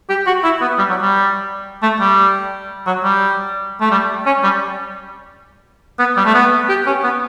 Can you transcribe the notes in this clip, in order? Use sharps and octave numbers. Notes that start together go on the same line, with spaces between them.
G4
F#4
E4
B3
G3
F#3
G3
A3
G3
F#3
G3
A3
G3
C#4
G3
B3
G3
A3
B3
G4
C#4
B3